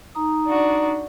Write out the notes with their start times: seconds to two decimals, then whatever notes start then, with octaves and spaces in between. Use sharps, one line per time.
0.15 D#4 A#5 D#6
0.47 D4 F#4